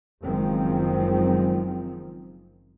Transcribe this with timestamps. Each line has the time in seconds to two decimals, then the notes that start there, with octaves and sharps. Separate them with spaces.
0.22 F#1 D#3 F3 G#3 C4